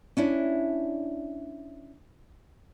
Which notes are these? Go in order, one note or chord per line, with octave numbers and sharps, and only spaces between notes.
C#4 D4 E4